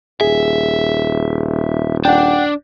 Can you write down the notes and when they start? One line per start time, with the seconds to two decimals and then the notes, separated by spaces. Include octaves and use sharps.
0.21 D#1 G#4 E5
2.05 D4 F#5 G5